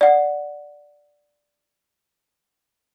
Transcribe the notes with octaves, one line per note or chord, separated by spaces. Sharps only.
D5 F#5